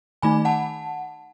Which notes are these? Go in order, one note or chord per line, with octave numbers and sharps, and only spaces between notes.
D#3 A3 D#4 G#5 B5
F#5 A5